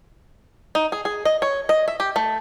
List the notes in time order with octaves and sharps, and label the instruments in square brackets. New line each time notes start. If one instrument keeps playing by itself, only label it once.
[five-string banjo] D#4
G#4
G#4
D#5
C#5
D#5
E5
G4
A3